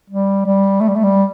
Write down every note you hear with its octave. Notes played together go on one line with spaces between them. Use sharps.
G3
G3
A3
G3
A3
G3